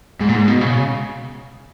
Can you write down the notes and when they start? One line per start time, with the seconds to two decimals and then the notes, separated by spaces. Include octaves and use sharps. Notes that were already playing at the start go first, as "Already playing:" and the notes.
0.20 G#2
0.28 A#2
0.34 G#2
0.48 B2
0.61 C#3